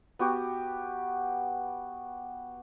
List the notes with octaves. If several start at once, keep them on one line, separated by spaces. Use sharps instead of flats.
B3 F#4 G4